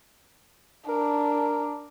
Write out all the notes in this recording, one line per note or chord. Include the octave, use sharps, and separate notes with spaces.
D4 A#4